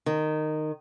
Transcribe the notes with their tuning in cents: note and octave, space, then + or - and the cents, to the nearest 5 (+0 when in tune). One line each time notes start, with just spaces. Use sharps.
D#3 -15